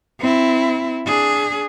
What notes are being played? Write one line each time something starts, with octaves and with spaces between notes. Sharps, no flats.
C4 E4
D4 G#4